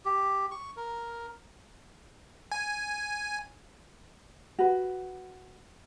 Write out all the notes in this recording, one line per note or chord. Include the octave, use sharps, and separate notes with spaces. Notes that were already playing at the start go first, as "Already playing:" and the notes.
G4
C#6
A#4
G#5
F#4 B4